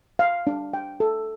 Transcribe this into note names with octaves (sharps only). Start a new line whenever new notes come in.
F5
D4
G5
A4